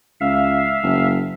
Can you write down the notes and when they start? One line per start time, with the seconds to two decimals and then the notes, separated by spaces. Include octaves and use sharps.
0.21 C#2 E5 F5
0.83 F#1